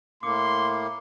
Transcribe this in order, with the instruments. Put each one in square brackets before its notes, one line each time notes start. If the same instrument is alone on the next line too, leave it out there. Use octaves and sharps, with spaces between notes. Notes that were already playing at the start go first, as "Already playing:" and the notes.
[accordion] A2 A#3 [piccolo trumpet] C6 [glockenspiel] D6 C#7